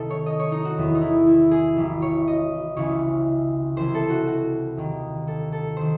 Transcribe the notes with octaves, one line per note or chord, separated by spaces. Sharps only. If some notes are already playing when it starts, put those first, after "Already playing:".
Already playing: C2 C3 D#3 A4
C#5
D#5
C#5
D#4
F#4
E1 E2 D#3
D#4
E4
E4
G#4
G#1 G#2 E3
C#5
D#5
C#2 C#3 E3 C#5
C2 C3 E3 C5
A4
F#4
F#4
D#2 D#3
A4
A4
D#3 C5